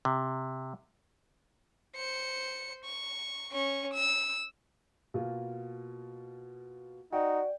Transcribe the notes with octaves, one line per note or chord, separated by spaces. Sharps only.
C3
C5 C#7
C#6
C#4 C#6
E6
B2 A#3 F4
D#4 F#4 D5 G5